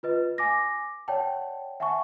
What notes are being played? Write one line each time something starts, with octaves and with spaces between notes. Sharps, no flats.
F4 B4 D#5
G#5 D6 A#6
C#5 D5 F#5 G5 A5
E5 F#5 G#5 A5 C#6